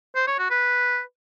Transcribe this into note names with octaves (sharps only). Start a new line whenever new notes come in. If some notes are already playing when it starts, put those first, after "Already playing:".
C5
C#5
F#4
B4